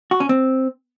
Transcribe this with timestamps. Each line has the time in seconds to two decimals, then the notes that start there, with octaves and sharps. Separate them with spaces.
0.11 F#4
0.20 C#4
0.29 C4